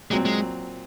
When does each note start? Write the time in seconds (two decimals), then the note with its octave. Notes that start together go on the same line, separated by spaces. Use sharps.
0.11 A#2 F#3 G#3 C4
0.25 G#3